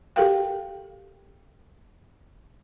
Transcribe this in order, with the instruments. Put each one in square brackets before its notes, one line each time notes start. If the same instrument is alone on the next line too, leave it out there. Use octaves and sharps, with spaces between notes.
[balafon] F#4 G4 A4 A#4 F5 G5